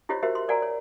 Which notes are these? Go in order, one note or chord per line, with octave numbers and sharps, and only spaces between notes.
E4 F4 G4 C5 C#5 D#5
F#4 G4 A#4 C5 C#5 E5
C6
A#4 D5 F#5 G#5 A#5
C#5